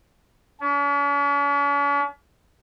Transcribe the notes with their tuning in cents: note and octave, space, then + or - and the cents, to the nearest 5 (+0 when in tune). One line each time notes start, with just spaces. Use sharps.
C#4 +45